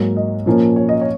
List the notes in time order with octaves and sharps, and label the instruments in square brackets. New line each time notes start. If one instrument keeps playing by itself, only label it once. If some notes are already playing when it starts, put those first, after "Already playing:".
Already playing: [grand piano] G#2 F#3 A#3
D#5
A#2 F3 A#3 C#4
C#5
D#5
C#5